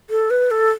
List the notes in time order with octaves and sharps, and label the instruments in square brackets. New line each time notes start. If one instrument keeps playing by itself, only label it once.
[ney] A4
B4
A4